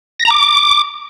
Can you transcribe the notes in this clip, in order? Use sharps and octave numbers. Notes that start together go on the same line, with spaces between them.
A#6
A#5
D6